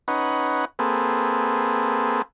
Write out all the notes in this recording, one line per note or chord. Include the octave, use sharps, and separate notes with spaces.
C#4 D#4 B4 F#5
A#3 C4 G#4 A4 B4